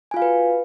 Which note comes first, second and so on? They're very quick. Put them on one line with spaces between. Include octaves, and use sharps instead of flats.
G#5 F4 F5 F#4 B4